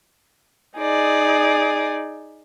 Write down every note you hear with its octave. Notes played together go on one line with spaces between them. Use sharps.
D#4 G#4 D5